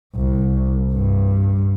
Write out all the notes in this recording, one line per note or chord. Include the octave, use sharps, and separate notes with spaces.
C2
G2